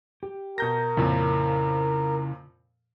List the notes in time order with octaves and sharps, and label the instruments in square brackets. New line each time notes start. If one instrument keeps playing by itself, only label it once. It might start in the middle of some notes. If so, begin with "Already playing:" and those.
[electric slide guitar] G4
[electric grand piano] B2 G6 A#6 [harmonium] A#4
[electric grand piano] F2 A#2 F3 [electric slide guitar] C#3 E4